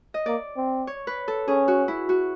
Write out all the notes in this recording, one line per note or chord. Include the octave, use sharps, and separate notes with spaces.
D#5
A#3 D5
C4
C#5
B4
A4
C#4 G#4
F#4
E4
F#4